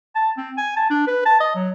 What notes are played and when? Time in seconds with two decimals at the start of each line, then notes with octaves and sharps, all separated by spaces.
0.15 A5
0.37 C4
0.58 G#5
0.77 A5
0.90 D4
1.07 B4
1.26 A5
1.40 D#5
1.55 F#3